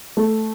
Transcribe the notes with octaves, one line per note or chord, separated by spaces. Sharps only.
A3